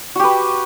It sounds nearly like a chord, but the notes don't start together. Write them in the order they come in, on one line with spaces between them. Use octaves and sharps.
F#4 G4 B4